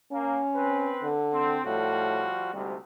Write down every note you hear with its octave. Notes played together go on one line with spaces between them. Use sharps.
A#3 C#4
C4 B4
D3
C4
A2 F3 G3 F#4
D2 G#2 C3 G3